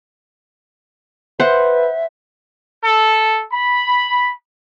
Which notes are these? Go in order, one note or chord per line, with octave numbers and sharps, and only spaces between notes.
B4 C5 E5 F#5
A4
B5